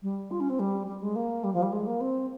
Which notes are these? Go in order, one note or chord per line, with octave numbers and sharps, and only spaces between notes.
G3
F4
C#4
C4
G3
G3
G#3
A#3
G3
F3
G3
G#3
A#3
C4